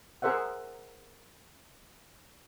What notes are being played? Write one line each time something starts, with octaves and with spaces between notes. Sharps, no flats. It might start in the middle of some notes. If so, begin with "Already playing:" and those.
G#4 A#4 C5 E5 F#5